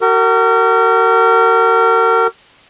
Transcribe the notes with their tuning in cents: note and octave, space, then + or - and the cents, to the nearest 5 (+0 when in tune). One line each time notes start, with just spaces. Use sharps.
F#4 +35 A#4 -35